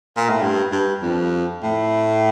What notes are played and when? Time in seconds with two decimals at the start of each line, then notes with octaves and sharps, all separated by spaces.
0.17 A#2
0.30 A2
0.42 G2
0.72 G2
1.02 F2
1.63 A2